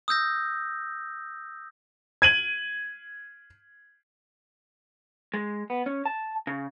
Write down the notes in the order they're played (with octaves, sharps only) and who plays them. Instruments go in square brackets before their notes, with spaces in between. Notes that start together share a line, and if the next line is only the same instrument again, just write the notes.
[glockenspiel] D#6 E6 G6 A#6
[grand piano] G#6 D#7 F#7
[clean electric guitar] G#3
B3
C#4
A5
C#3